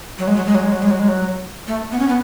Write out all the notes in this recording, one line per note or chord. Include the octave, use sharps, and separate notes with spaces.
F#3
G#3
F#3
G#3
F#3
G#3
F#3
G#3
F#3
G#3
F#3
A3
B3
C#4
B3